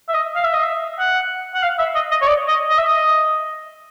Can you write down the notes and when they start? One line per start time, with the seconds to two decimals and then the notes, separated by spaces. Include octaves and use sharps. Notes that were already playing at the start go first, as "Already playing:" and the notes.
0.08 E5
0.14 D#5
0.35 F5
0.44 E5
0.53 D#5
0.63 E5
0.99 F#5
1.54 F#5
1.63 F5
1.79 E5
1.95 D#5
2.11 D#5
2.21 C#5
2.27 D5
2.48 D#5
2.69 D#5
2.78 E5
2.86 D#5